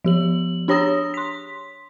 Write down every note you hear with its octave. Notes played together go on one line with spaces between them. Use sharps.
F3 G4 F#7
D4 G4 C#5 A#5 D#6 A#6
C6 B6